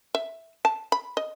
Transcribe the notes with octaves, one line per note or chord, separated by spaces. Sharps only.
E5
A5
B5
D#5